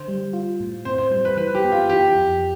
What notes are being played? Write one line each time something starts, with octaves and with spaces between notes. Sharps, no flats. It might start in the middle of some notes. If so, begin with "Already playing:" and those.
Already playing: D3 C5
G3
F4
A2
C4 C5
C5
G3 C5
B4
E3 B4
G4
B3
F4
E3 G4
F2